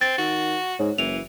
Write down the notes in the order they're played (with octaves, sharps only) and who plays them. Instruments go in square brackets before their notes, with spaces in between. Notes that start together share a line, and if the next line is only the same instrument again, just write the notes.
[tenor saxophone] C4 [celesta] A6
[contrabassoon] D#3 [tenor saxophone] F#4
[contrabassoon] G#2 [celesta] C#5
[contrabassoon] F#1 [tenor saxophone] E3 [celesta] F7